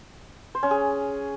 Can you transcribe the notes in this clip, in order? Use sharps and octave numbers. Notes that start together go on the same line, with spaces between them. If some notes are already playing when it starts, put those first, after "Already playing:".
C5
C#4
G#4